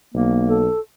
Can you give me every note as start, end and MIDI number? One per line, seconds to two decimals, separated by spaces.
0.14 0.68 35
0.14 0.63 58
0.48 0.80 69